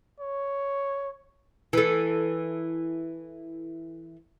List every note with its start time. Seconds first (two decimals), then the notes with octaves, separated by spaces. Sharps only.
0.20 C#5
1.73 E3 A4